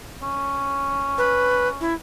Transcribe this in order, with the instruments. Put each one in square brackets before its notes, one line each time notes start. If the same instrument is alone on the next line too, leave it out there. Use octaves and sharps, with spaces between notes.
[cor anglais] C#4
[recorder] B4
E4